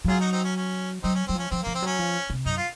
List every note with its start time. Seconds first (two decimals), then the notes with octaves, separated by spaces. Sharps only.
0.05 F3
0.08 F#3 F4 G#4
0.20 D#4 F#4
0.32 C4 D#4
0.44 C#4
0.56 C#4
1.03 F#3 C4 D#4
1.15 C#4
1.27 F#3 C4
1.35 F3 C#4
1.51 F3 C4
1.63 A#3
1.67 F3
1.75 C4
1.82 F#3 C#4
1.99 F3
2.30 C3
2.46 F#2 D#4
2.57 F4